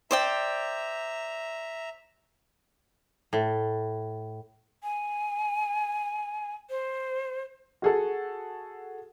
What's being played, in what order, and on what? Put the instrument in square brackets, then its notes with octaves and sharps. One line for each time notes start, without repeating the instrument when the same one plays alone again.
[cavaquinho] C5 D5 G5 [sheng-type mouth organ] E5 A#5
[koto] A2
[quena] G#5
C5
[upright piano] F#4 G#4 A4